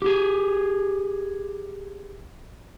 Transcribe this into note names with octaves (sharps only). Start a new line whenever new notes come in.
G4 G#4